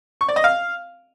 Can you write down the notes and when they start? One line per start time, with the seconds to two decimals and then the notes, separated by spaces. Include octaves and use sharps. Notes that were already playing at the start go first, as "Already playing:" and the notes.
0.21 C#6
0.28 D5
0.36 D#5
0.44 F5